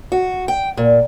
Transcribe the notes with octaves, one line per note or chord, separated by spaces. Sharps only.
F#4
G5
A#2